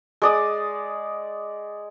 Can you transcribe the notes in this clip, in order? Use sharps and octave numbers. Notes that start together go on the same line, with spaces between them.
G#3 D5 D#6